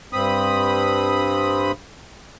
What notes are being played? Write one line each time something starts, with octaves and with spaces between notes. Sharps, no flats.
G2 C4 B5 D#6